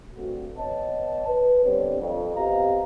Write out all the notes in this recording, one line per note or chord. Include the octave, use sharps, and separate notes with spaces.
G2 A3 C4 F#4
B3 C#5 D#5 A5
B4
D3 G3 B3 C4 C#5
F2
B3 C4 G4 D#5 F5 A#5